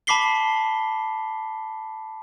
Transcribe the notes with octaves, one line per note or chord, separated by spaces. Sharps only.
A5 B5 D6 B6 C7 G7